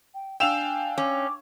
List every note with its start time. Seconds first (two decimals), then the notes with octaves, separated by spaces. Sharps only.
0.14 G5
0.40 D4 F5 G5 G#5 E6 E7 F7
0.98 C#4 D6